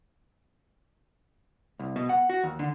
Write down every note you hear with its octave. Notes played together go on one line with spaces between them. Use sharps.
C2
B2
F#5
F#4
D#2
D3